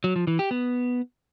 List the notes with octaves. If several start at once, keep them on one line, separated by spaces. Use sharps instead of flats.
F#3
F3
E3
G4
B3